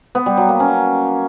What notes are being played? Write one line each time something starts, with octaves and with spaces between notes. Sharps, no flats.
B3
G3
F#3
A#3
C#4